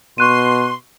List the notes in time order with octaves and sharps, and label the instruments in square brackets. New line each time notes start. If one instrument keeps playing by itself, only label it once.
[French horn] B2 [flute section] C6 [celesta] C#6 F#6 D#7